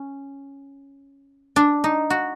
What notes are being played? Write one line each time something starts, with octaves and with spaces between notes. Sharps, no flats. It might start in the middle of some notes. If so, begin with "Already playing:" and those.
Already playing: C#4
D4
D#4
F#4